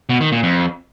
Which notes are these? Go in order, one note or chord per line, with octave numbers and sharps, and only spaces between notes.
B2
D#3
A#2
F2